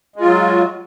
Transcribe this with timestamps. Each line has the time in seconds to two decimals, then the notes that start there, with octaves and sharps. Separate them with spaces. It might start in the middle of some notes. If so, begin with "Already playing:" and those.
0.16 G#3
0.21 F4
0.25 F#3